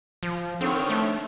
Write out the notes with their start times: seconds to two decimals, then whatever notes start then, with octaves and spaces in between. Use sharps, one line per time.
0.23 F3
0.61 D3 D#3 C4 C#5
0.89 A3